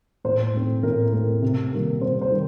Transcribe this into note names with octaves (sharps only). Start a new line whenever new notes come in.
A2 C5
A3 C4
A2 A#4
A3 C4 A#4
C3
D#3 G3 A#3
C3 C5
C5
D#3 G3